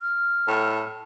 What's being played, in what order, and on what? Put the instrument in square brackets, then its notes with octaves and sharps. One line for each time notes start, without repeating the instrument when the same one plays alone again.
[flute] F6
[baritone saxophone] A2